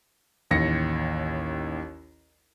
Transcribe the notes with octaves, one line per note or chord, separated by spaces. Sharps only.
A1 D#2 A#6 C#7